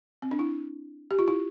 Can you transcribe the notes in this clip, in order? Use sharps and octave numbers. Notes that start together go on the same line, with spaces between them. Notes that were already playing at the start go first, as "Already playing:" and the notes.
C4
D4
E4
G4
F4
E4